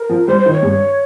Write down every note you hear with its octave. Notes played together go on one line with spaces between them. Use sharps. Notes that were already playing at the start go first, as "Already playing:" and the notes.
Already playing: A#4
F3
G3 C5
C5
D#3
C#5
G2